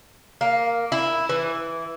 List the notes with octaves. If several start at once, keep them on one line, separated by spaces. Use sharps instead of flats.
A#3
E4
E3